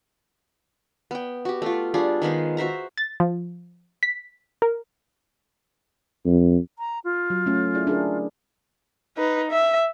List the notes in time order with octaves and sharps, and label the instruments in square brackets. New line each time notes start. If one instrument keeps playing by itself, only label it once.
[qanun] B3 G5
F#4 G4
A3 F4
G3 D4 F4 G#4
D#3 G#3 B3 C5
F#4 C5 E5 A#5
[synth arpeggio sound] A6
F3
B6
A#4
[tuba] F2
[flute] A#5
F4
[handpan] F#3
A3 C#4
E4 G#4 D5
D4 G#4 A#4
[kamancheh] D#4 B4
E5